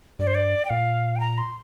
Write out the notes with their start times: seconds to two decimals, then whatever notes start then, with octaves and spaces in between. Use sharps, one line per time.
0.19 G2 D5
0.27 C5
0.35 D5
0.65 G5
0.70 A#2 F5
1.16 G5
1.20 A#5
1.38 C6